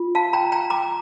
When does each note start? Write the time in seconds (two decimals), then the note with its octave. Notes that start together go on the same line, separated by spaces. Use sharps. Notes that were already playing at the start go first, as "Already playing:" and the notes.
Already playing: F4
0.15 F5 A5
0.33 G5 A#5
0.52 G5 A#5
0.70 A#5 D6